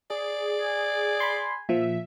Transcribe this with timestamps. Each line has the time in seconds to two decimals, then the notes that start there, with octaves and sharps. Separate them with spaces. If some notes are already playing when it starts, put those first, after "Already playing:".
0.10 G#4 D5
0.61 G#5
1.20 B5 C6
1.69 A#2 F3 E5